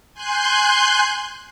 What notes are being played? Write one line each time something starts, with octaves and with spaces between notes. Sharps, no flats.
G#5 C6 F#6 G6